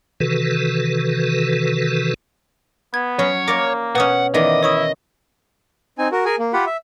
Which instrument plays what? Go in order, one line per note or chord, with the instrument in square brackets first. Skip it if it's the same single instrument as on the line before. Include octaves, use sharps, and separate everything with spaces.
[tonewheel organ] C3 D#3 E3 F#4 A4 B4
[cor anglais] B3 [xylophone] G#6
[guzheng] F#3 C#4 [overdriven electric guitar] C#5
[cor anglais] A#3 [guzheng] A#4 D5 F5 [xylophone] D6
[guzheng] B2 C#4 [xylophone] B4 D#6 [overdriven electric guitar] F#5
[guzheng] D#3 E3 B3 [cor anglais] D5 [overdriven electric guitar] D#5
[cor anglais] E4 [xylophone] C#5 C#6 D#6
[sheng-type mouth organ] C4 D#4 G#5
F#4 A#4
G#4 A#4 G#5
A#3
F4 G4 F#5 B5
E5